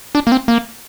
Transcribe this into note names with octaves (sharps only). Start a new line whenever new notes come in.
D4
A#3
C4
A#3